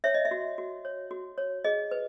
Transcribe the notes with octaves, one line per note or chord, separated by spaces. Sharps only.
C#5 E5
D#5
E5
F#4
F#4
C#5
F#4
C#5
G#4 D#5
B4